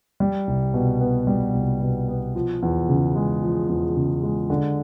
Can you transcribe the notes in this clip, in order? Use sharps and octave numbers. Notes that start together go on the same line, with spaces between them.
G3
C2
B2
B3
G3
C2
B2
B3
F3
E2
C#3
G#3
F3
E2
C#3
G#3
D3